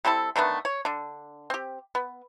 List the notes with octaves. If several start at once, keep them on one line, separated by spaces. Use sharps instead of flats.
G3 C4 E4 A4
D3 D#3 A3 B3
C#5
D3 D4
C4 G4
B3